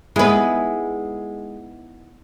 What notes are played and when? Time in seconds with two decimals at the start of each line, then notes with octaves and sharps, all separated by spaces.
0.16 G#3 B3 D#4 E4 B4